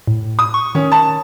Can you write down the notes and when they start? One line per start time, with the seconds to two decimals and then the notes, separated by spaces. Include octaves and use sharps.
0.07 A2
0.39 D#6
0.54 C#6
0.75 D#3 C#4
0.92 A5